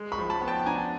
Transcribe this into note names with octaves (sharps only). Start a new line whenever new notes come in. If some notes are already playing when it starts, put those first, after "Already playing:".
Already playing: G#3
B5 C#6
F3
A5 B5
B3
G5 A5
D4 G#5 A#5